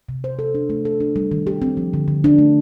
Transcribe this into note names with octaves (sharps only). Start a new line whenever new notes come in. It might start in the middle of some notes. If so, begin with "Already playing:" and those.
C3
C5
A4
D4
A3
A4
D4
G3
D#3
G4
C4
F3
D3
D3
D4
A3